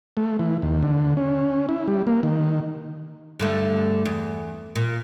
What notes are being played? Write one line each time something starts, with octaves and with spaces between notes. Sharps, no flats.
A3
E3
D#2
D3
C#4
E4
G3
A#3
D#3
G2 D3 A3
E2
A#2